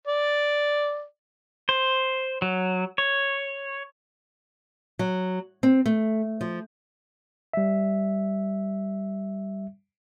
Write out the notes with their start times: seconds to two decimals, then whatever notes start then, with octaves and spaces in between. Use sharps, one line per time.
0.08 D5
1.69 C5
2.42 F#3
2.98 C#5
4.99 F#3
5.63 C4
5.86 A3
6.41 F3
7.54 G3 E5